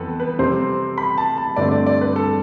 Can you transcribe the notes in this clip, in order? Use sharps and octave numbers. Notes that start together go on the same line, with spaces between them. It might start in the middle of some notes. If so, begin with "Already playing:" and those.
Already playing: F2 E3 B3 A4 B4
B4
F2 C3 G3 C4 C5
B5
A5
A5
G2 D3 A3 C4 D5
D5
D5
B4
A4